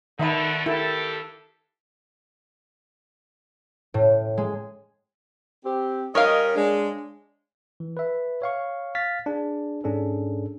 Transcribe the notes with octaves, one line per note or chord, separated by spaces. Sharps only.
B2 D3 D#3 A3 D#4 E5 B5
G2 E4 G4 A4 A#4
A2
G#3
C4 G4
G3 C#4 A#4 C#5 D#5 F5
G#3 D4
E3
B4 E5
C#5 F5 C#6
F5 F6 A6 B6
D4 G#4
G#2 C#4 D4 G#4 A4